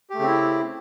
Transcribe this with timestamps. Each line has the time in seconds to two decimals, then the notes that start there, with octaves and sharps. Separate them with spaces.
0.10 G4
0.14 A3
0.19 C#3
0.23 C4
0.27 E4